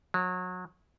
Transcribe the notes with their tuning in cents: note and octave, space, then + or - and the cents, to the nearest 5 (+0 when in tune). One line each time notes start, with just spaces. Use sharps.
F#3 -30